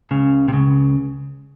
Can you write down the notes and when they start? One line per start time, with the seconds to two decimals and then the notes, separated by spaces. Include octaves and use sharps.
0.11 C#2 C#3
0.48 C3
0.53 C#2 C#3